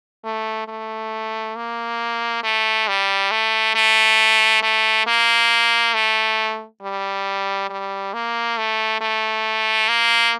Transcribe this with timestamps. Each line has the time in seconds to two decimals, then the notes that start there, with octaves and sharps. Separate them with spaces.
0.24 A3
0.68 A3
1.56 A#3
2.43 A3
2.88 G3
3.31 A3
3.75 A3
4.63 A3
5.07 A#3
5.94 A3
6.82 G3
7.69 G3
8.14 A#3
8.57 A3
9.01 A3
9.88 A#3